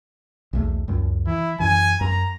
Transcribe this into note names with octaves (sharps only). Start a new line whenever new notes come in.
B1 E2 A3
C#2 F#2
E3 E4
F#2 E3 G#5
F#2 A#5